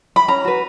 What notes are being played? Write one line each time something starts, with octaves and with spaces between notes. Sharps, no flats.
B5
C#4 A#5
F#4 B4